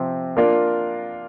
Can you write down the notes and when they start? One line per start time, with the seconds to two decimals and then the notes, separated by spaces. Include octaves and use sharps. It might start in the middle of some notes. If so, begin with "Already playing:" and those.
Already playing: C3 F3 C4
0.37 A#3 D4 F4 A#4 D5